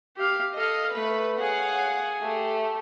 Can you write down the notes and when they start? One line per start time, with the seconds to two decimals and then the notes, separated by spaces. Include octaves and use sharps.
0.17 G4 F5
0.56 A4 D#5 F5
0.93 A3 B4
1.40 G#4 C#5 F5 F#5
2.22 A3 G4